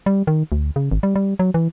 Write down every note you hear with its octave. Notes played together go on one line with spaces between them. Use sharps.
G3
D#3
D2
C#3
G#1
G3
G3
F#3
E3